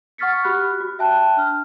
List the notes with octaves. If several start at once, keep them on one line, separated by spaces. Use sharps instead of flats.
F#5 C#6 F6 A6 B6 C#7
F#4 G4 B5 F6 F#6
F#4
E5 G5 A5 F#6
D4 F6